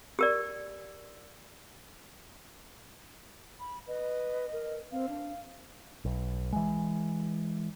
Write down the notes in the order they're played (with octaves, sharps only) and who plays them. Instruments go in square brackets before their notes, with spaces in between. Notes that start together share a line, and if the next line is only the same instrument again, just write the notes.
[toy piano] G4 A#4 D5
[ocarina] B5
[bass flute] B4 [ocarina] D#5
[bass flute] A#4
[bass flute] C4 [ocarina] F5
[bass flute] D4
[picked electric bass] B1
E3 G#3